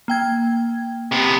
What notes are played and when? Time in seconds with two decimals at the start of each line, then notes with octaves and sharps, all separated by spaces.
0.08 A#3 G5 G#6
1.12 C3 B3